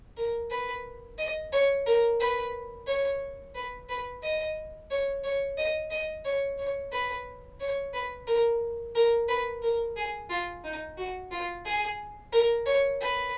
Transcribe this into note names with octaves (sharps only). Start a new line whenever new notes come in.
A#4
B4
D#5
C#5
A#4
B4
C#5
B4
B4
D#5
C#5
C#5
D#5
D#5
C#5
C#5
B4
C#5
B4
A#4
A#4
B4
A#4
G#4
F4
D#4
F#4
F4
G#4
A#4
C#5
B4